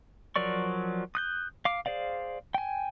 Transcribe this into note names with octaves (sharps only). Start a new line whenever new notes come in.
F3 F#3 A#4 D5 C#6
D#6 F#6 G6
F5 D6
G#4 C5 D5 F5
G5 G#5